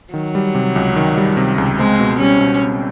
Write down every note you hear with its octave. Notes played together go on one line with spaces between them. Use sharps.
D#3 F#3
G3
C3
C#2
D#3
G3
C3
C#2
G#3 C4
B2
G3 C#4
B2
C4